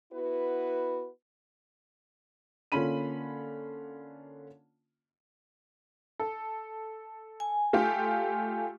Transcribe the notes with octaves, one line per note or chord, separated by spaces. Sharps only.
B3 E4 F#4 B4
D3 A#3 C#4 F4 B5 D#7
A4
G#5
A3 F4 G4